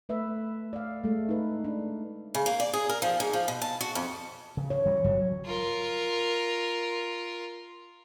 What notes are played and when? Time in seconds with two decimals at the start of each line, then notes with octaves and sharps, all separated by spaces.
0.09 A3 B4 E5
0.73 D5 F5
1.04 G#3 A3
1.29 D#4 B4
1.64 D4
2.35 C#3
2.46 A#3
2.60 D5
2.73 G#4
2.89 A#4
3.02 F3
3.20 G#2
3.33 F3
3.48 B2
3.62 A5
3.81 F#4
3.95 F2
4.57 C#3
4.70 C#5
4.86 E3 F#3 G3
5.04 G1 G2 C#3 F#3
5.46 F4 A#4